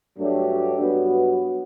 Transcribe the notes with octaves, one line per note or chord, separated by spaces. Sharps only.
G2 F#3 A3 D4 G4
G2 F#3 B3 F#4